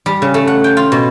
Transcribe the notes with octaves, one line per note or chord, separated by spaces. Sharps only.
G3
C#3
A3
F#5
G5
F4
B2